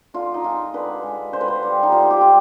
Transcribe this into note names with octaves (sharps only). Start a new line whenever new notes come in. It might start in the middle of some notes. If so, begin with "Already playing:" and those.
D3 F4
D#4
G#3 F4
D3 B4
G#3
D3 C5
B4
C5
G3
D#4
D3 F4
G4
G3 F4